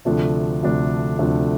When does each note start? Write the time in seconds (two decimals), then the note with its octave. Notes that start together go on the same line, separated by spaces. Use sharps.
0.05 D2 C3 F3 A3 D4
0.62 D2 C3 F3 A3 D4
1.18 D2 C3 F3 A3 D4